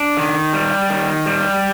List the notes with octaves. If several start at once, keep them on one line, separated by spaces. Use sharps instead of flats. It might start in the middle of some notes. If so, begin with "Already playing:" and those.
Already playing: D4
D#3
G3
D#3
G3